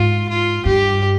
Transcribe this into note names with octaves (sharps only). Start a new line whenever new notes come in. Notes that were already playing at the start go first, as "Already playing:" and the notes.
Already playing: G#2 F4
F4
G2 G4